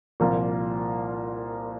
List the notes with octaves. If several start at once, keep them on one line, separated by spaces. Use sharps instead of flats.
C2 A#2 F3 A#3 F4